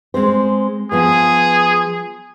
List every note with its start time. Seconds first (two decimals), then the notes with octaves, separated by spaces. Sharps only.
0.14 G#3 C4 C5
0.92 F3 B3 G#4